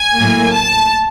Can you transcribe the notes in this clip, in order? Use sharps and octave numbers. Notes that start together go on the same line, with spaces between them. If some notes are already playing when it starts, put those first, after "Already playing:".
Already playing: G#5
A2 F#3 A#3
A5